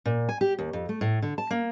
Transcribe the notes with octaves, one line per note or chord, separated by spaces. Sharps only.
A#2
G#5
G4
D#2
F2
A3
A2
D3
A5
A#3